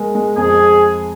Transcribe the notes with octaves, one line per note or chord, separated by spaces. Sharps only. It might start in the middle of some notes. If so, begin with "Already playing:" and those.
Already playing: G#3 A#4
G#3
F2 G#4